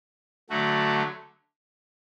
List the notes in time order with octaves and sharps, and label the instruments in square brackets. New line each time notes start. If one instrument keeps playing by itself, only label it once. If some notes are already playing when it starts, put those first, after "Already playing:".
[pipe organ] D3 F#3 A3 F#4